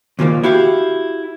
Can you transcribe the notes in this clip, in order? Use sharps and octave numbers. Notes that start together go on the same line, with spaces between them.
D#2 A#2 F3 A#3
E4 F#4 G4 F5